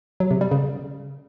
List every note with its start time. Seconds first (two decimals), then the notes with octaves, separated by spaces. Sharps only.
0.20 F#3
0.31 C3
0.41 G3
0.51 C#3